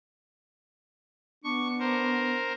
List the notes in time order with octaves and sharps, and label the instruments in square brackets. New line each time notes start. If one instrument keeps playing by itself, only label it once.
[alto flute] B3 [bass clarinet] D4 [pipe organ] C#6
[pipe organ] A#4 C5